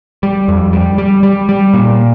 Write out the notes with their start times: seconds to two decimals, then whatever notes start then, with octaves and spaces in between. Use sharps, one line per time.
0.23 G3
0.48 F2
0.73 G3
0.98 G3
1.23 G3
1.49 G3
1.74 A#2